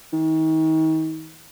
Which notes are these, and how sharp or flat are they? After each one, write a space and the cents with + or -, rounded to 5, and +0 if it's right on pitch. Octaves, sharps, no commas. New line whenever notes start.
D#3 +35